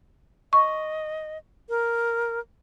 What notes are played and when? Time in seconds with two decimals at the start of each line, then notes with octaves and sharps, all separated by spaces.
0.53 D#5 C#6
1.69 A#4